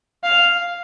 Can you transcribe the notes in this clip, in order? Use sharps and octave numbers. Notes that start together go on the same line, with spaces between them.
F5